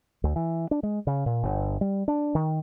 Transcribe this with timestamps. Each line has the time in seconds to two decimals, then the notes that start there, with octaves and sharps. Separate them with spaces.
0.24 D2
0.36 E3
0.71 D4
0.83 G#3
1.07 C#3
1.26 A#2
1.43 G1
1.81 G3
2.08 D4
2.35 D#3